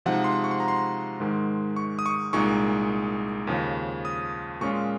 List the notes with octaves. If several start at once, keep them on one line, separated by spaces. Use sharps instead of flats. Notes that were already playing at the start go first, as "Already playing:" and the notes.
C3 F3 G#3 D#4 F#5
C6
C#6
C6
A#5
C6
G#2 D#3 G#3
C#6
D#6
C#6
C2 A#2 G#3 D#4 C#6
D#2 C#3 F3
D#6
A#2 G#3 C#4 F4 C#6